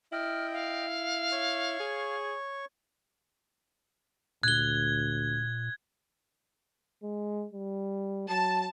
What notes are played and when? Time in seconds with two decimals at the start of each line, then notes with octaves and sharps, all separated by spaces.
0.12 E4 D#5 G5 F6
0.52 F5
1.32 C#5 C#6
1.80 G#4
4.43 D2 A#2 F#6 G#6 G7
7.03 G#3
7.53 G3
8.29 F#3 A5